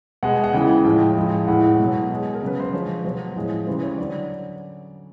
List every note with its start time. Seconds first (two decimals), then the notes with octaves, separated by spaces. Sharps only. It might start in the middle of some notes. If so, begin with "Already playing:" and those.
0.23 B2 G#3 F#5
0.44 F#5
0.53 C#3 E3 G#3 G5
0.85 A2 F3 G#3 G5
1.17 A2 F3 G#3
1.48 A2 E3 G#3 F#5
1.80 B2 F#3
2.10 B2 G#3
2.34 A#4
2.42 C#3 F#3 B4
2.60 C5
2.73 D3 F3 G#3 C#5
3.04 B2 F#3 C5
3.35 A2 F3 G#3
3.67 C#3 E3 G3 C5
3.83 C#5
3.98 D3 F#3 D5